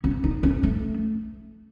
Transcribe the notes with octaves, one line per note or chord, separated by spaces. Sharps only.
C#4
D#4
C#4
A3